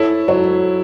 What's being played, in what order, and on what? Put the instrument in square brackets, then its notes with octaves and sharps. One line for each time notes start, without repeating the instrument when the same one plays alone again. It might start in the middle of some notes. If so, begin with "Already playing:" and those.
Already playing: [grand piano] E4 [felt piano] A4 C#5
[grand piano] F#3 [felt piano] C#5